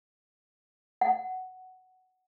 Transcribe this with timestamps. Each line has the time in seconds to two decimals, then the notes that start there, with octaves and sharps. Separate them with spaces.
1.01 F#5